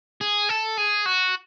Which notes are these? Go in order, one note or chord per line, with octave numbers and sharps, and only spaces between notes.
G#4
A4
G#4
F#4